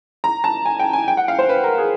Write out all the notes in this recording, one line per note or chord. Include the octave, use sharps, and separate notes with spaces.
A#5
A5
G#5
G5
G#5
G5
F#5
F5
C5
B4
A#4
G#4